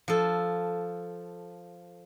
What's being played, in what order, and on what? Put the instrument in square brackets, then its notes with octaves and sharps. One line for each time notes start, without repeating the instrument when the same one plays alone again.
[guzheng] F3 A4